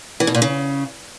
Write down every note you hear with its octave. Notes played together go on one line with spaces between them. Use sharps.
E3
B2
A#2
C#3